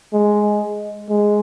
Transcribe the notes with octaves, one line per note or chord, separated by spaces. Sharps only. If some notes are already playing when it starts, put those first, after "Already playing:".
G#3
G#3